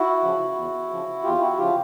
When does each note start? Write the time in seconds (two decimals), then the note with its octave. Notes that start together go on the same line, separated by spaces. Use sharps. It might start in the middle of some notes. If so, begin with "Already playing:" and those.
Already playing: E4 F#4
0.21 C#3 F3
0.56 E2
0.90 C#3 F3
1.23 E2 F4 G4
1.41 E4 F#4
1.58 C#3 F3 F4 G4